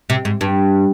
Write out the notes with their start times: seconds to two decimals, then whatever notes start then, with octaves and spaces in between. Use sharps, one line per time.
0.10 C3
0.25 G#2
0.41 G2